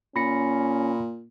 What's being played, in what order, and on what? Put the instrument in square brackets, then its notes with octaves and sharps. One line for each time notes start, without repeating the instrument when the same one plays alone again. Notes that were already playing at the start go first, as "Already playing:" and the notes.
[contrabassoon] A#2 [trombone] C#4 [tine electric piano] B5 A#6 C#7